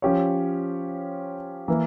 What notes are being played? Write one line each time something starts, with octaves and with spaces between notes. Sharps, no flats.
F3 C#4 G4 C#5
E3 A#3